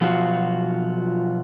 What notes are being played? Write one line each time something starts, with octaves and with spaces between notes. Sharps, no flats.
B2 F3 F#3 F4 F#4